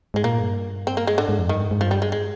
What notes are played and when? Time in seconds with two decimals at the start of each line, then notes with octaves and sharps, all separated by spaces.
0.14 G#2 G#3
0.24 A#2 A#3
0.39 G2
0.87 C4
0.97 A#3
1.07 G#3
1.18 G#2 D3
1.29 G#2
1.39 F2
1.49 G2 D#3
1.60 G#2
1.71 G#2
1.81 G2 F3
1.91 G3
2.02 G#3
2.12 G#3